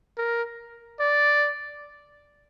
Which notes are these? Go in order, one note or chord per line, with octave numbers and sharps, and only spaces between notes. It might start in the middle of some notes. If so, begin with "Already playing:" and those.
A#4
D5